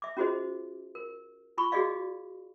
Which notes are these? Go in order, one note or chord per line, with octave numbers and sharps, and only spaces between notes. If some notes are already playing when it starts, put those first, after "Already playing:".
E5 D6
C#4 F4 F#4 G#4 C5 D#5
A#4
F4 B5 C#6
F#4 G#4 D5 D#5 F5